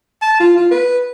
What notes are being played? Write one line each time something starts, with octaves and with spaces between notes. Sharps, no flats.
A5
F4
F4
B4